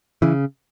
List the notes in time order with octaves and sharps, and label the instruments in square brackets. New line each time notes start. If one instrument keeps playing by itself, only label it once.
[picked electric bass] C#3 E3